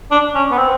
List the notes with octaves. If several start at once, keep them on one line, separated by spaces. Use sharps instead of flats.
D4
C#4
B3
C4